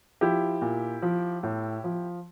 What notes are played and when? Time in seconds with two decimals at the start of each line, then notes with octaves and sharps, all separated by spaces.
0.21 F3 E4 G4
0.61 A#2
1.02 F3
1.43 A2
1.84 F3